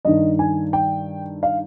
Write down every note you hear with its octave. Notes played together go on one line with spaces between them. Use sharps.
G2 D#3 D#5
G#5
G5
F5